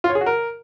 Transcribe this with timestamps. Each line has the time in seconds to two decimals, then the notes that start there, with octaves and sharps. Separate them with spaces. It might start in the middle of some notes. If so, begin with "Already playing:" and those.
0.04 F4
0.10 C#5
0.15 G#4
0.21 F#4
0.26 A#4